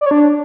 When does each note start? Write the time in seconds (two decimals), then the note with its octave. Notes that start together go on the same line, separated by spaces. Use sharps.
0.01 D5
0.06 C#5
0.11 D4